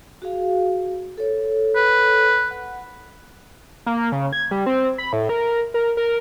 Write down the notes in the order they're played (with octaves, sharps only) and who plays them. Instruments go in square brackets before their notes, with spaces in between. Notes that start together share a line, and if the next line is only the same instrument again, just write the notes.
[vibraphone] F#4 G#4 F5
A4 C#5
[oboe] B4
[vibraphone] F#5
[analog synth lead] A#3
C#3
G#6
G3
C4
B5
A2
A#4
A#4
A#4